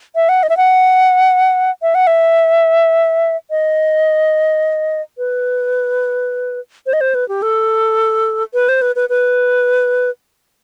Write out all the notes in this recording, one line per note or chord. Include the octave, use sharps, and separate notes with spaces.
E5
F#5
D#5
E5
F#5
E5
F#5
E5
D#5
B4
C5
D#5
C5
B4
G4
A4
B4
C5
B4
B4
B4